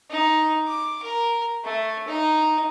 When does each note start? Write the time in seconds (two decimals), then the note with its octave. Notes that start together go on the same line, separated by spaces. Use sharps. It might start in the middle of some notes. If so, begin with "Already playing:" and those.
0.10 D#4
0.67 D6
1.03 A#4
1.64 A3
2.07 D#4